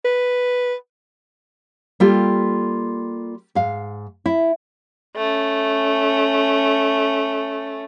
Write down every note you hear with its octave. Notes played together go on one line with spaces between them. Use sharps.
B4
G3 A#3 F4 G4 A4
G#2 F5
E4
A3 C#4